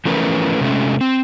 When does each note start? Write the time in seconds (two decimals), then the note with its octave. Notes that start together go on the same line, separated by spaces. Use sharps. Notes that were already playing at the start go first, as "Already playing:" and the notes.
0.05 E3 F3 A3 C#4 A#4 B4
0.61 C3 G#3 A3 C#4
1.01 C4